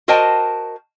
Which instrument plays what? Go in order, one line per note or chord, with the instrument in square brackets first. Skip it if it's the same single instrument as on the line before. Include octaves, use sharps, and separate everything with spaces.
[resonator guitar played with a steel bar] F#4 A#4 C5 D#5 G5 A5